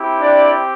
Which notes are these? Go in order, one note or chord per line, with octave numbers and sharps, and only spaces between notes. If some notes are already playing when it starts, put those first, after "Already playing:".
Already playing: C4 E4 G4
D4 D5